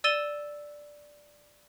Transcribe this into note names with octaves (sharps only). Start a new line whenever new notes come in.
D5 E6 A6 D#7 E7 G7